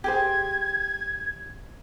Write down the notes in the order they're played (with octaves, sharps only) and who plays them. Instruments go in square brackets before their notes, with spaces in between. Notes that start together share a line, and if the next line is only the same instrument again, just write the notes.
[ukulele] G4 G#4 C5 [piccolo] G#6